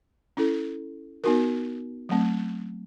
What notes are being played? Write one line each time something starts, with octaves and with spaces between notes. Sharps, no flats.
C#4 E4 A4
B3 D#4 F#4 A#4
F#3 A3 C4